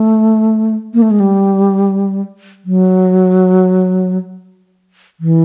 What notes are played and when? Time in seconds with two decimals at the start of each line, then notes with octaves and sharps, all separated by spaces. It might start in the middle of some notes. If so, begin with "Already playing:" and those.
Already playing: A3
0.94 A#3
1.02 A3
1.11 G#3
1.20 G3
2.65 F#3
5.20 E3